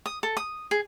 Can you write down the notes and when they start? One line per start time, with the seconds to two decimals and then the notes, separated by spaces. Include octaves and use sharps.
0.06 D#6
0.23 A4
0.37 D#6
0.71 G#4